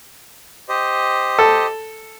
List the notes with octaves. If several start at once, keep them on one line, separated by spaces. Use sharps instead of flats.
G4 C5 D#5
A4